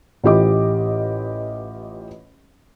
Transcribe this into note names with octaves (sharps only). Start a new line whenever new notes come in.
A1 E3 F4 G4 D#5 D6